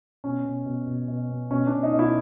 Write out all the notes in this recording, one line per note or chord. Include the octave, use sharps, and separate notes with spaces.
B2 C#4
B2
B2
B2
B2
B2
B2 C#4
D4
B2
D#4
B2
E4